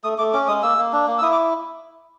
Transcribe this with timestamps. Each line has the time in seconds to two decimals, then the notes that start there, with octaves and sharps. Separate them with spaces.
0.04 A3 D#6
0.18 A3 D6
0.33 C#4 D6
0.48 G#3 D#6
0.63 A#3 E6
0.78 A#3
0.93 D4
1.07 A#3
1.18 E6
1.22 E4 D#6
1.32 D6